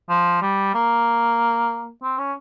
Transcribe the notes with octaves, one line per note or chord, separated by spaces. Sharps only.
F3
G3
A#3
C4
C#4